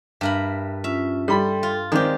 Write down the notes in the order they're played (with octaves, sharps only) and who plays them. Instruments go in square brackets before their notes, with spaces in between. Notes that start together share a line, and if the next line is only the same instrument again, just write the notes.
[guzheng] G2 A#4 B5 [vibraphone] E5
[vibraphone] C#4 F4 [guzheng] E5
[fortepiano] G3 B5 [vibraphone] A4 G5 C6
[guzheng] F4
[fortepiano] D#3 C4 [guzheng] G#3 G4 [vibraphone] D5 D6